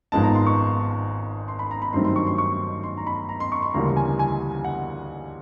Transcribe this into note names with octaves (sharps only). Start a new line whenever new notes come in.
G#1 G#2 F3 G#3 B3 A5
A#5
C6
C#6
C6
B5
A#5
B5
G2 D#3 F#3 A3 C4 C6
C6
C#6
C6
C#6
C6
A#5
B5
A#5
C6
C#6
C6
D2 C#3 E3 G3 A#3 A#5
G#5
G#5
F#5